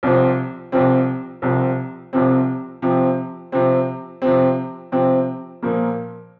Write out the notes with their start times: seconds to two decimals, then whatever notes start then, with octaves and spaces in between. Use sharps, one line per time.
0.03 C2 C3 F3 C4
0.72 C2 C3 F3 C4
1.42 C2 C3 F3 C4
2.13 C2 C3 F3 C4
2.82 C3 F3 C4
3.52 C3 F3 C4
4.22 C3 F3 C4
4.92 C3 F3 C4
5.62 A#2 F3 A#3